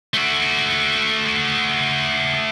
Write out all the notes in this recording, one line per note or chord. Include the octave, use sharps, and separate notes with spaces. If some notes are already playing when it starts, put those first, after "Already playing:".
A3 F#4